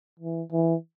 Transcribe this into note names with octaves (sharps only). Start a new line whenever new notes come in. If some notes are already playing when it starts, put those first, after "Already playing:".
E3
E3